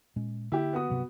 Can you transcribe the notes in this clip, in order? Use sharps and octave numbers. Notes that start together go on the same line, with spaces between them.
A#2 G#3 C#4
D3 A#3 E4 G4
B3 F#4 D#6
G2 C3 F#3